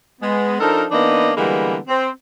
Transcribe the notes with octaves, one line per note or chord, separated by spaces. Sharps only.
G#3 B3
F3 D4 D#4 A4 A#4
E3 A#3 B3 D4 D#4 D#5
D3 E3 G3 G#3 A#3 B3
C4